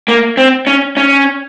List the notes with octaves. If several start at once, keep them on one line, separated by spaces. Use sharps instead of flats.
A#3
C4
C#4
C#4